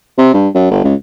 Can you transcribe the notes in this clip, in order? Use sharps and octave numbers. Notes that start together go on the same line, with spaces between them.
C3
G2
F#2
G1
C#2